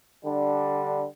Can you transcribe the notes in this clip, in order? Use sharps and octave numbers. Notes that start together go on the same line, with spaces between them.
D3 G3 D4